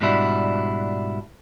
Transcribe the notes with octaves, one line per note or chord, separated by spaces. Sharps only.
G#2 B2 G3 D4 E4 F#4